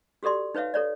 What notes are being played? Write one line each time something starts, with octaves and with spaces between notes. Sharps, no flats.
F#4 G4 A4 D5 C6
D#4 B4 C#5 E5 F5
A4 C#5 D5